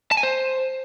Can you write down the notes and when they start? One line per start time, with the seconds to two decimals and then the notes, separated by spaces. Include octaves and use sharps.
0.11 A5
0.17 G#5
0.23 C5